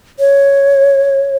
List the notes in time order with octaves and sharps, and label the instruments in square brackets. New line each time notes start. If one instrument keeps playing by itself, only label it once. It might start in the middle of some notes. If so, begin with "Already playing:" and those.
[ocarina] C#5